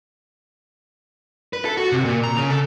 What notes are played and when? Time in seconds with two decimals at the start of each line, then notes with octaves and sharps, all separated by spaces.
1.53 B4
1.65 A4
1.77 F#4
1.92 C3
2.05 A#2
2.24 A#5
2.37 C#3
2.50 A4